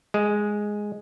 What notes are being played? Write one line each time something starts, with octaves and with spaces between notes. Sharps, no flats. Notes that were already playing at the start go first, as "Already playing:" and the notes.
G#3